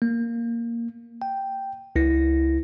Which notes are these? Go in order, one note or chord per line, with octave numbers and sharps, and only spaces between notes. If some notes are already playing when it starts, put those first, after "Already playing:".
A#3
G5
C#2 E4 A#6